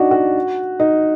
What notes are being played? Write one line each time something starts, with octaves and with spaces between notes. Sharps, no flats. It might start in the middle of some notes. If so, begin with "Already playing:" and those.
Already playing: D4 D#4 F#4
F#4
D#4